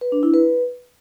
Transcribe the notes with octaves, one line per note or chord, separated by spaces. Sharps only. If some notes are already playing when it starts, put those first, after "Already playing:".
B4
D4
E4
B4